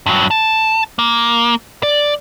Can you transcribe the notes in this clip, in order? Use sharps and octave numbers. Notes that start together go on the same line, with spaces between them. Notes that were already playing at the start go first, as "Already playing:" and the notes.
G2 F#3
A5
A#3
D5